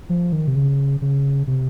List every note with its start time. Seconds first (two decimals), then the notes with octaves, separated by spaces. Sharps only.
0.09 F3
0.32 D#3
0.48 C3
0.55 C#3
1.02 C#3
1.47 C3